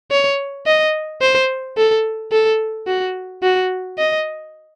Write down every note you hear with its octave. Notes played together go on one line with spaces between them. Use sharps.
C#5
D#5
C5
A4
A4
F#4
F#4
D#5